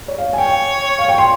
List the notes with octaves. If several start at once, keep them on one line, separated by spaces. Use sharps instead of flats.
C#5
F5
G#5
C#5 G5
F5
G5
C6